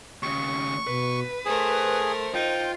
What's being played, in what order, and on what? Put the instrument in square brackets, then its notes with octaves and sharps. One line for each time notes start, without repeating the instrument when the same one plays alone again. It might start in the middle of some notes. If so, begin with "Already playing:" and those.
[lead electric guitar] D#2 C#3 [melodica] C#6
[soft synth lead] B2 [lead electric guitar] B4
[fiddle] A3 A#4 [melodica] G#4 [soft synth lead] C5
[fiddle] D#4 [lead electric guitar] F4 [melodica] G5